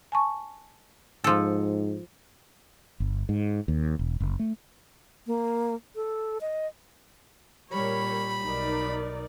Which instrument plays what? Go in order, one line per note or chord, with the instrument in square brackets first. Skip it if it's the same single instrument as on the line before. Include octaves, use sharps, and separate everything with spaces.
[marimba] G#5 A5 C#6
[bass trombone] G#2 [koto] F3 A4
[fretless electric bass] G1
G#2
D#2
E1
F#1
A3
[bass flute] A#3
A4
D#5
[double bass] A#2 G3 [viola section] A#4 C#5 [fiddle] B5
[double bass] B1 [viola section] D#4 A#4 D5